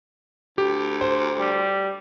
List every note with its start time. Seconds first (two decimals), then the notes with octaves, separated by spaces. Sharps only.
0.58 D2 G4
1.01 C5
1.39 G3